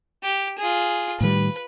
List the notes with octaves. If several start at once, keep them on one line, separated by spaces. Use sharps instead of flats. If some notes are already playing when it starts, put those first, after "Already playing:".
G4
F4 G#4
A2 D#3 G3 B4